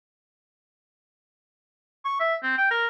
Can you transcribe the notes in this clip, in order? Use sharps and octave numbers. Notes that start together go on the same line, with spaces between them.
C#6
E5
C4
G5
A#4